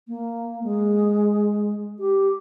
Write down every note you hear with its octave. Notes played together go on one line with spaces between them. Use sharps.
A#3
G#3
G4